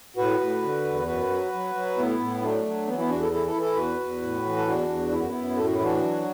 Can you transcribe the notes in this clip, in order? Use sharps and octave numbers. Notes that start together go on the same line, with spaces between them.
A2 F#4 B4
A2
D3
E2
F#2 F#4 B4
F#3
F#3
F#3
A2 B3 E4
A2
F#3 A3 D4
F#3
E3 B3
B3 E4
E2 D4 F#4
E4 A4
E3 E4 A4
E4 A4
E3
E4 A4
E2 F#4 B4
E2
A2
E3
A4
E2 D4 F#4
E2
F#2 E4
F#4
B3 E4
F#2
A2 A4
F#4
E4
E3 D4 F#4
F#3